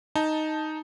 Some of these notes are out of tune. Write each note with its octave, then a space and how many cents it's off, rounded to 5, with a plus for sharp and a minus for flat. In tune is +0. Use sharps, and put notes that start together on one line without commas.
D#4 +0 A5 +0